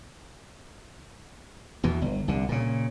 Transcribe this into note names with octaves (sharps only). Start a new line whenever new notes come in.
E2 B2 E3
G1
C2 D3
A#2 C#3